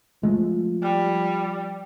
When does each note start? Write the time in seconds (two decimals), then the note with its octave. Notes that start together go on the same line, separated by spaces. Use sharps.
0.23 F3 G#3 A3
0.82 G3